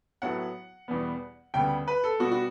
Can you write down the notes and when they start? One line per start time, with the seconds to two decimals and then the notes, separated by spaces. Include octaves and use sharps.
0.22 A2 F#3 B3 F#5
0.88 E2 B2 G3 B3
1.54 D2 C#3 G3 B3 G5
1.88 B4
2.04 A4
2.19 B2 G3 B3 F#4
2.32 F#4